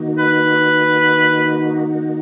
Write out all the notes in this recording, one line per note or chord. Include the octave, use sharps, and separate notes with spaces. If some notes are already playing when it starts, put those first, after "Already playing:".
Already playing: D#3 A#3 D#4 F#4
B4